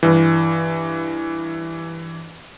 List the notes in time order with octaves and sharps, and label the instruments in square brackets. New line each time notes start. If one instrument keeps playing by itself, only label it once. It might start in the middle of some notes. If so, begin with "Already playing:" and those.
[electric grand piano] G2 E3